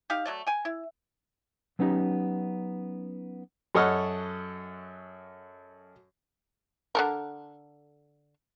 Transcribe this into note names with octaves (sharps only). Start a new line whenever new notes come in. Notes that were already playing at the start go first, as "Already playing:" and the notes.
D#4 G4 F5
F#3 A3 D5
G5 G#5
E4
F#3 B3 C#4 D#4 G4
F#2 A4 C#5 D#5 F#5 F6
D3 A4 A#4